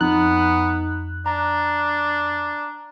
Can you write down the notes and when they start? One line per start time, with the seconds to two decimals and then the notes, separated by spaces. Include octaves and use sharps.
0.01 F2 B3 D#4 F#6
1.26 D4 A#5